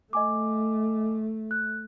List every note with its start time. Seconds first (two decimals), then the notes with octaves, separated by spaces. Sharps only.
0.13 A3 D#5 G#5 D6
1.51 F#6